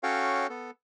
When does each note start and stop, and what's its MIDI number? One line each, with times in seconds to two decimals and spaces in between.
0.03 0.47 61
0.03 0.47 66
0.03 0.47 69
0.03 0.47 73
0.03 0.47 77
0.03 0.47 79
0.49 0.71 59
0.49 0.71 69